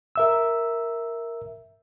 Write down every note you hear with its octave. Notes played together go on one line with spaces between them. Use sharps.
A#4 E5 E6